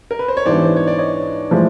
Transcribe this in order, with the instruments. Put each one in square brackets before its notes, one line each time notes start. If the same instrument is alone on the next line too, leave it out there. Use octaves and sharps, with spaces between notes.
[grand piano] A#4
B4
C5
C#5
[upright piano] G#2 E3 G3 B3 D4 [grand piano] C5 D5
[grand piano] C5
C#5
D5
C#5 D#5
[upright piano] A2 F3 G#3